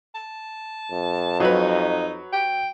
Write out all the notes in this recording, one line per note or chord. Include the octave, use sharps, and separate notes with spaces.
A5
F2
F#3 D#4 F#4 B4
G5